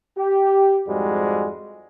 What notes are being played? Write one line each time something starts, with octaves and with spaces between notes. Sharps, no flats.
G4
F2 G#2 G3 G#3 F#4